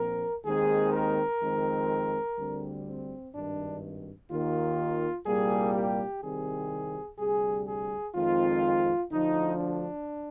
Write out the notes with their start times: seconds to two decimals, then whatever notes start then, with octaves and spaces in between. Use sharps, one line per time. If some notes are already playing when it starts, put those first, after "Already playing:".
Already playing: A#1 A#2 F3 C4 A#4
0.45 D#2 D#3 G#3 C4 G#4
0.93 A#4
1.41 F2 D#3 G#3 C4
2.37 D2 D3 G3 C4
2.85 C4
3.34 G#1 G2 D#3 D4
4.30 D#2 D#3 A#3 F4
5.26 C2 A#2 G3 A#3 G#4
5.75 G4
6.22 C2 C3 D#3 G3 C4 G#4
7.19 D2 C3 G3 G#4
7.67 G#4
8.15 F2 D#3 G#3 C4 F4
9.11 D2 D3 F3 D#4
9.60 D4